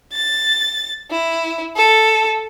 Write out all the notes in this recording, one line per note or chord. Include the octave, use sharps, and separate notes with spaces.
A6
E4
A4